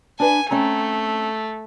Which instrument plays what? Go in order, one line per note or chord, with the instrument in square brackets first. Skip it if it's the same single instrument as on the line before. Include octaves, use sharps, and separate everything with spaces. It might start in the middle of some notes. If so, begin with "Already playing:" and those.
[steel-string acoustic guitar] D4 B4 [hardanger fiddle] G#5
[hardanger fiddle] A3 [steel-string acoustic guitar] C4 C#4 A#5